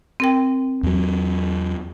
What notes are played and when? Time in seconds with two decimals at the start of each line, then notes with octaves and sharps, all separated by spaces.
0.20 C4 A#4 G5
0.83 E2 F#3